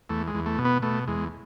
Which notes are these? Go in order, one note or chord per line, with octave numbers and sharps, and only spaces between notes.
E2 A3
G#3
E2
A3
B2
B3
B2 A3
E2 G#3